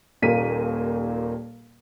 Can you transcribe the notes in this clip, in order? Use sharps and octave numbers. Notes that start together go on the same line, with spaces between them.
D#1 D#2 A#2 A#3 B6 D#7